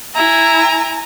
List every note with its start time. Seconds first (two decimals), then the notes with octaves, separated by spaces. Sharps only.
0.15 E4 G#5 A#5